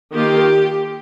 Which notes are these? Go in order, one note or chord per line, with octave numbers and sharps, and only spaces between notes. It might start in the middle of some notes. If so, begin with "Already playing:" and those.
D#3 A#3 F4 G4